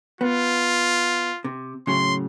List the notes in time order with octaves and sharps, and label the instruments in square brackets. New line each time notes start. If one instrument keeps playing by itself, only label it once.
[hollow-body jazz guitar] B3 [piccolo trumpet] F4
[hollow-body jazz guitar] C3
[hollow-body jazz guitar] A2 C#3 F#3 [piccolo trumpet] C6